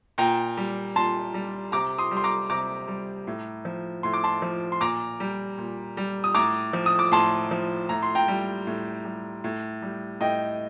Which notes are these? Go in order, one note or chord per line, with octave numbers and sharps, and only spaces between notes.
A#2 G5 A#5
G3
A#2 A5 C6
G3
C3 A#5 D6
C6 D#6
G3
C6
A#5 D6
C3 A#5 D6
G3
A2
F3
A2 C6
D6
A5 C6
F3
C6
A#2 A#5 D6
G3
A#2
G3
D#6
A2 A#5 D6
F3
D#6
D6
A2 A5 C6
F3
A2 A#5
C6
G5 A#5
G3
A2
G3
A2
G3
A2 D#5 G5